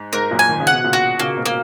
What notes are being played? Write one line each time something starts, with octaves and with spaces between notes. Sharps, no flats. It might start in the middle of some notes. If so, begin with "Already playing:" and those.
Already playing: G#2
G#2 A#4
F#2 A#2
G#5
D#3
C#3
F#5
B2
A#2 C#3
F#4
A#2 C#3 A#3
G#2 B2
A#3